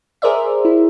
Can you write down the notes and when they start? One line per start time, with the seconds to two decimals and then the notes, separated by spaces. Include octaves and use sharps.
0.22 G#4 A#4 C5 D5 E5
0.65 E4